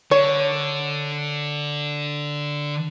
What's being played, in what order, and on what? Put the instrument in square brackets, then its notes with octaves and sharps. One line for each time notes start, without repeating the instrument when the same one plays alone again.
[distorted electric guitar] D3 [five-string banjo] C#5